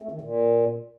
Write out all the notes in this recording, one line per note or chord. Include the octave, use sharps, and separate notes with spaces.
A3
D#3
A#2